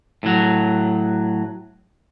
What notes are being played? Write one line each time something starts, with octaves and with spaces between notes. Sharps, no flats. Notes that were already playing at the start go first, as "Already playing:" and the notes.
A2 F#3